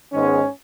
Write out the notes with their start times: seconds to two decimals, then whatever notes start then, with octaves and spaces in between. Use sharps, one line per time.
0.12 G#2 D#3 G#3 B3 C#4